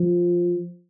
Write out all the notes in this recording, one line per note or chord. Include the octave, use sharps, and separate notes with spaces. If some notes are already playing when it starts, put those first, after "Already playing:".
Already playing: F3